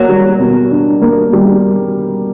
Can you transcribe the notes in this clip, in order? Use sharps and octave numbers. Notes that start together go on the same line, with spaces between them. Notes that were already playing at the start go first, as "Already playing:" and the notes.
Already playing: F#3 A#3
G3
B2
D4
A#3
G3